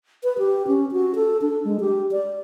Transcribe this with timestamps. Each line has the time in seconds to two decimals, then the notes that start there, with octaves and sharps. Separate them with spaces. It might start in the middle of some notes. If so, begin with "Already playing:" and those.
0.24 B4
0.38 G4
0.67 C#4
0.92 F#4
1.15 A4
1.42 D4
1.65 G#3
1.80 G4
2.12 D5